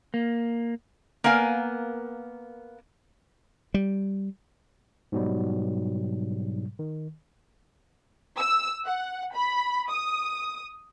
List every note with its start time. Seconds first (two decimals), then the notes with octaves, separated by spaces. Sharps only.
0.14 A#3
1.24 A#3 B3 A#4 F5 G#5
3.74 G3
5.12 G#2 B2 F#3 G3
6.79 D#3
8.37 E6
8.85 F#5
9.34 B5
9.90 D#6